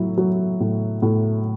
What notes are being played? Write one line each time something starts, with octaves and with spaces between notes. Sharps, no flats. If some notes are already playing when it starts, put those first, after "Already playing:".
Already playing: A2 F#3 E4
F#3
A2
A2